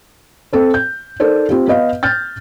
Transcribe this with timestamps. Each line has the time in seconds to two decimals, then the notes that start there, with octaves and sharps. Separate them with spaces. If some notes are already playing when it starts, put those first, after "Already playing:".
0.53 C4 A4 C5
0.74 G6
1.20 D#4 A4 A#4 C5 D5
1.49 C4 F4 G4
1.68 B3 B4 D#5 F5
2.03 F6 G6 A6